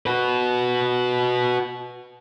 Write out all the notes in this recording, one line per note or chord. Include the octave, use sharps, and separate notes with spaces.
F#4 B4